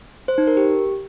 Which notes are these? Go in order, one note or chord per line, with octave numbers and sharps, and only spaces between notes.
C5
D#4
A#4
G4